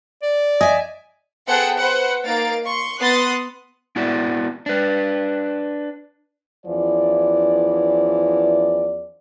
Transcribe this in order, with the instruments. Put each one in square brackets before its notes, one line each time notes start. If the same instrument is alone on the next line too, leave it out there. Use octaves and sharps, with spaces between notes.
[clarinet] D5
[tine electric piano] D#5 [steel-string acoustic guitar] E5 G#5
[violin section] B3 G#4 A4 C5 F#5 G5
B4 C5 F#5
A#3 D#4 F5 A6 D7
C6 C#6
B3 C6 D#6 F#6 A6
[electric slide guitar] B3 E4 F#4 D5
D4 B4
[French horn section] E2 E3 F3 C#4 D5